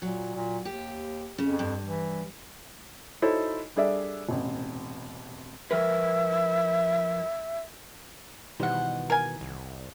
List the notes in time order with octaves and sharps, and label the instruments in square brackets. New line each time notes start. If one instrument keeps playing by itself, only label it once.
[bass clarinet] A#2 [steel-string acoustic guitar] F#3
[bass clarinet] A#2
[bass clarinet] D#2 [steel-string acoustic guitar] G4
[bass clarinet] F2 [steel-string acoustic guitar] C#3
[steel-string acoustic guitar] G2
[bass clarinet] E3
[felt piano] D#4 E4 F#4 A4 C5 C#5
G3 D4 G#4 A4 D5 E5
E1 A1 C3
[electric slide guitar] F3 A#4 B4 [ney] E5
[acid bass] B2 [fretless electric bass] D#3 E3 G3 [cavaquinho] C5 F#5
[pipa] A#4 G#5
[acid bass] C2